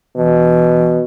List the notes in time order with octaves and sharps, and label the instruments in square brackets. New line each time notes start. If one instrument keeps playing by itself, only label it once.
[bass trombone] B2 [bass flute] E3